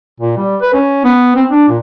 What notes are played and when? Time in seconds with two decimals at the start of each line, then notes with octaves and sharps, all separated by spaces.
0.20 A#2
0.37 G3
0.61 B4
0.74 C#4
1.05 B3
1.36 C4
1.51 D4
1.69 A#2